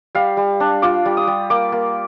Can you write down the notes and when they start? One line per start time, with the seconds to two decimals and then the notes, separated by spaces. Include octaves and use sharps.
0.15 G3 F5
0.37 G3
0.60 D4
0.82 F4 D6
1.06 G3
1.17 D#6
1.27 G3
1.50 A#3 D6
1.72 A#3